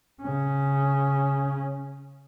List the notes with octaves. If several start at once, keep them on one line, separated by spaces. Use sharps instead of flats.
C#3 C#4